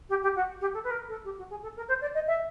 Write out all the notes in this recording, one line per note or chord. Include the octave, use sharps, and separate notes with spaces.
G4
G4
F#4
G4
A4
B4
A#4
A4
G4
F#4
G#4
A4
A#4
C5
D5
D#5
E5